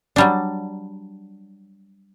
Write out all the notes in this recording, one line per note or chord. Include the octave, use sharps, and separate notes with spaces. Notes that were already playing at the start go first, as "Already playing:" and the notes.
F#3 G3 D4